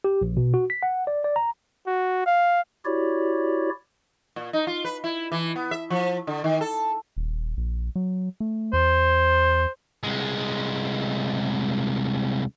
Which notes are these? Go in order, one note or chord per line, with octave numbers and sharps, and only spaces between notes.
G4
A#1
B2
F#4
B6
F#5
D5
D5
A#5
F#4
F5
E4 F#4 G4 C#5 D5
A#2
D#4
F4
B4
E4
E3
B3
E5
F3
D3
D#3
A4
D#1
A#1
F#3
A3
E2 C5
C2 G#3